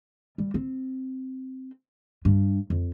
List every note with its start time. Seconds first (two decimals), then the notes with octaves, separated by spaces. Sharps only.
0.38 G3
0.54 C4
2.25 G2
2.70 F2